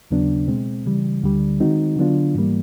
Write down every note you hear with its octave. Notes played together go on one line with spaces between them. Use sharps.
D#2 C#3 F#3 B3 D4
B2 G#3 C4
C#3 E3 G3
D2 D3 G3
D#3 G#3 C4 D#4 F#4
D3 F#3 B3 D4 F4
G#2 E3 G3 A#3